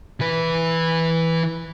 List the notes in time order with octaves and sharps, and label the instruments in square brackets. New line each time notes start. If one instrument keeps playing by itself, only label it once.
[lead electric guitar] E3 B4